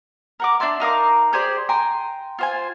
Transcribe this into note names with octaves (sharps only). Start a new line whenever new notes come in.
A#4 F#5 D6
D4 D5 E5 C6
D#4 A#4 F5 D6
G4 G#4 C5 D5
G5 G#5 A#5 C6
F4 C5 G#5